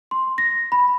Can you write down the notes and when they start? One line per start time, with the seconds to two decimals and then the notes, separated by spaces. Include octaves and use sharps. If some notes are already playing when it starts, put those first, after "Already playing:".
0.11 C6
0.38 A#6
0.72 B5